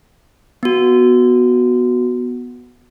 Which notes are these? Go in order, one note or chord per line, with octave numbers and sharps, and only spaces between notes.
B3 F#4